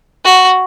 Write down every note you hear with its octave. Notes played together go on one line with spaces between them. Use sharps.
F#4